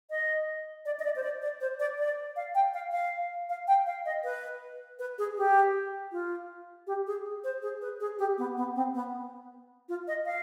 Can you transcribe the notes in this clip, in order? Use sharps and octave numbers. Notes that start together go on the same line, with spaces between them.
D#5
D5
D#5
D5
C5
D5
D5
C5
D5
D5
F5
G5
F5
F5
F5
G5
F5
D#5
B4
B4
G#4
G4
F4
G4
G#4
C5
G#4
B4
G#4
G4
B3
B3
C4
B3
F4
D#5
F5